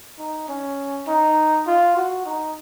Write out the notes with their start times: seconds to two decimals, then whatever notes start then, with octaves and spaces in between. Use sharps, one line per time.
0.19 D#4
0.48 C#4
1.08 D#4
1.67 F4
1.97 F#4
2.26 D#4